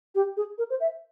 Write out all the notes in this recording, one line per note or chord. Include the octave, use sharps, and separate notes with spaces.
G4
G#4
A#4
C5
E5